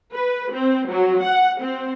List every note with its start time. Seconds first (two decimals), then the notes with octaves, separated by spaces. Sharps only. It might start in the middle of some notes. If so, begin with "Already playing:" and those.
0.12 B4
0.51 C4
0.88 F#3
1.23 F#5
1.60 C4